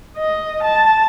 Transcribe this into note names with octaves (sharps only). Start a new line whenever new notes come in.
D#5
A5